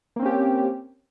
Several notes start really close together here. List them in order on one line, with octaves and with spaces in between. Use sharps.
A#3 C4 C#4 G4